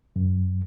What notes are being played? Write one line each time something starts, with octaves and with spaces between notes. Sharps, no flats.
F#2